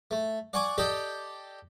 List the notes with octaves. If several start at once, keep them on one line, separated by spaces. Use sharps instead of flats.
A3
D5 F#5 G#5 C#6 D6
G4 A4 D5 D#5 G5